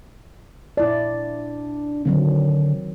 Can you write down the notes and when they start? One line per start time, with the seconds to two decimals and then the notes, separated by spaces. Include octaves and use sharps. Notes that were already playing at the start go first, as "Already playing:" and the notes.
0.77 A#2 D4 E4 D5
2.05 D3 D#3 F#3 C4